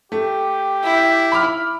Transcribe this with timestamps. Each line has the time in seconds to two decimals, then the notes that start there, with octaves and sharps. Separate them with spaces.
0.12 A3 G4
0.84 E4
1.32 B5 D6 F6